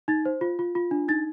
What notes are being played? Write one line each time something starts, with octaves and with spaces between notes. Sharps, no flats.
D#4 A6
C5
F4
F4
F4
D4
D#4 A6